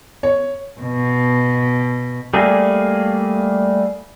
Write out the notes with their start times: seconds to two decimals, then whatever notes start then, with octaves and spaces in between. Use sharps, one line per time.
0.23 C#5
0.81 B2
2.34 G3 A3 A#3 G#4